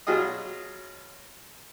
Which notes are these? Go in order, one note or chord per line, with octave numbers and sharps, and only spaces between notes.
B2 F#3 F4 G#4 D#5